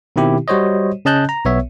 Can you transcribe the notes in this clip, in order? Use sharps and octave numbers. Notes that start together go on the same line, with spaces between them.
B2 D#3 C4 E4 G4
G3 F#4 C5 C#5 D#5
C#3 C#4 D#5 A5 F#6 G6
A#5
B1 B3 C#5 E5